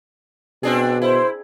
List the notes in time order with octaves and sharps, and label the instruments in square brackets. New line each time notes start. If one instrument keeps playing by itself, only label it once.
[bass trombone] B2 [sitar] C4 D4 G#4
[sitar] E4 [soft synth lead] C5